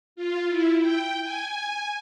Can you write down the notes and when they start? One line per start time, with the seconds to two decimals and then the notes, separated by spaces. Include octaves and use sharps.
0.16 F4
0.48 E4
0.80 G5
1.22 G#5